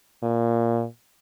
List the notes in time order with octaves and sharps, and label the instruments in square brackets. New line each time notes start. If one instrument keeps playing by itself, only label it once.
[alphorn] A#2